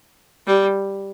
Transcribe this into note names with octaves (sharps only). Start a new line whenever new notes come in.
G3